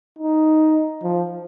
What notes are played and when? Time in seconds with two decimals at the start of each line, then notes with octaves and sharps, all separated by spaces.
0.19 D#4
1.03 F3